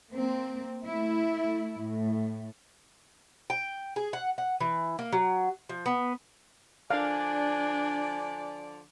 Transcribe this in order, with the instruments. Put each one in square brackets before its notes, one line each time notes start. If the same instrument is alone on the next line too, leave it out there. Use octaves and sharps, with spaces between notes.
[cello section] A#3 C4
A3 E4
A2
[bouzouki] G5
G#4
F#5
F#5
E3
A#3
F#3
F3
B3
[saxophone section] D3 F3 D5 [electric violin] D4 [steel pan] F5 [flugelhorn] G#5